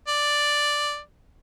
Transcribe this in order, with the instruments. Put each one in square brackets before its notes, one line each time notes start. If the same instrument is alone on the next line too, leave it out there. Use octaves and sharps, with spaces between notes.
[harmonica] D5